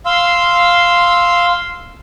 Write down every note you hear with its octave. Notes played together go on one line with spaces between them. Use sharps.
F5 C6 E6